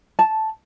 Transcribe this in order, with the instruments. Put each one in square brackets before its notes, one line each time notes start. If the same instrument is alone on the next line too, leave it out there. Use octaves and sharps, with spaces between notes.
[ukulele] A5